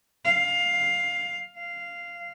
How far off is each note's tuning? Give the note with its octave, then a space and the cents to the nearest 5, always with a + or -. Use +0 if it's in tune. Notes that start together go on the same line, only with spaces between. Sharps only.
F5 +10
F5 -10